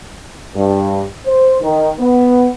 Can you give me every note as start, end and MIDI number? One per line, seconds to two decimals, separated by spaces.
0.55 1.03 43
1.26 1.56 72
1.61 1.90 51
1.99 2.48 59